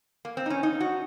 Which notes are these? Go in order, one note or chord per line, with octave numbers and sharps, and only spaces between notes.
A#3
C4
D#4
C#4
D#4
F#4